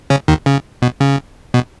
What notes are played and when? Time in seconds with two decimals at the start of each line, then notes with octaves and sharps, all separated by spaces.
0.10 C#3 C#4
0.28 D#2 D#3
0.46 C#3
0.82 B2
1.00 C#3
1.54 B2